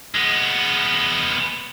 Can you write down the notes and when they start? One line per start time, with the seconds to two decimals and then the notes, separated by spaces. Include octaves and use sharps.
0.15 G#3 B3